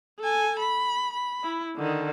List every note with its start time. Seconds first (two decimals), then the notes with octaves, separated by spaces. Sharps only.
0.20 A4 G#5
0.59 B5
1.13 B5
1.44 E4
1.77 D3 D#3